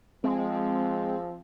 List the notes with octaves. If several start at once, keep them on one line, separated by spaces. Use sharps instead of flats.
F3 G#3 C4